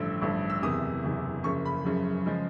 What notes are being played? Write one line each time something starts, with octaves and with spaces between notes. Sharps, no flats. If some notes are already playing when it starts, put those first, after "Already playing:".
Already playing: A1 G2 D3 F3 E6
A1 G2 D3 F3
E6
F#1 E2 C3 D#6
F#1 E2 C3
F#1 F#2 C#3 F3 C#6
B5
F#1 F#2 C#3 F3
C#3 F3 G#3